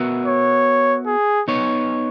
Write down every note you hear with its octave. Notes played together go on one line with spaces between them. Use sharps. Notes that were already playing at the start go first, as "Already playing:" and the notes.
Already playing: B3 F#4 A#4 E5
C#5
G#4
B3 D#4 C#5